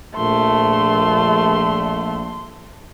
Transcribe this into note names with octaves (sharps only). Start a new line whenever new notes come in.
A#1 A3 C6